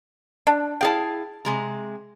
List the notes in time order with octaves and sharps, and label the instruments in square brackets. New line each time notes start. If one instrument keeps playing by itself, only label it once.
[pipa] D4
[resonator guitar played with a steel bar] E4 G#4 F5 [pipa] G5 A5
[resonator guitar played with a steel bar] C3 G#3 A#5